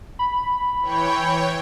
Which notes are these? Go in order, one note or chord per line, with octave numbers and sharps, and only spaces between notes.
B5
E3 C#5 G5